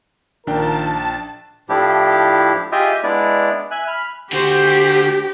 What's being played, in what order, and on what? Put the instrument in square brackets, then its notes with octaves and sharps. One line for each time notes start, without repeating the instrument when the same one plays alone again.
[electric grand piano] A#1 D4 G5 [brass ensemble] D#3 F4 A#4 [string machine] A5
[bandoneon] A2 F3 D4 E4 G4
F4 G4 G#4 D#5 E5 G5
G#3 B3 D4 E4 D5
E5 G#5 F#6
B5 F6
[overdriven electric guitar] D3 F#4 [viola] G4 [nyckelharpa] C5